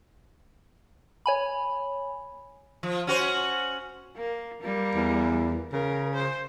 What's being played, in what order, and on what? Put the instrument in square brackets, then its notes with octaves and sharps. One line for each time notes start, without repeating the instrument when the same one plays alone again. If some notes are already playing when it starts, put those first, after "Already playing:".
[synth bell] C#5 G#5 B5
[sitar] F3
C#4 F#4 C5
[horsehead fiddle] A#3
G3 A#3
[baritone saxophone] E2
[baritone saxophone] C#3 [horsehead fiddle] A#4
[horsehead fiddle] C5